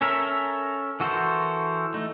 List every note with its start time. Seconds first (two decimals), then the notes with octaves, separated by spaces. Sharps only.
0.01 C#4 A4 A#4 E5
1.00 E3 F#4 A4 A#4 C5
1.94 A3 D#4